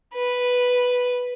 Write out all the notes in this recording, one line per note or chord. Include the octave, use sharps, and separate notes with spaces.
B4